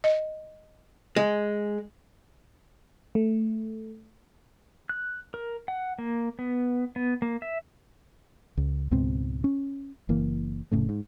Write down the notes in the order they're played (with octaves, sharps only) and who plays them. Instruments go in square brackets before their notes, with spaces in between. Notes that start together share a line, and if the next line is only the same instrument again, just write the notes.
[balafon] D#5
[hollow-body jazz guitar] G#3
[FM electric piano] A3
[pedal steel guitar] F#6
A#4
F#5
A#3
B3
B3
A#3
E5
[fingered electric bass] C#2
C#2 G#2 B2 C4
C#4
F#1 E3 A#3
F1 A2 C#3 A3
G#2